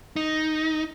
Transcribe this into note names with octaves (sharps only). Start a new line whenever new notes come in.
D#4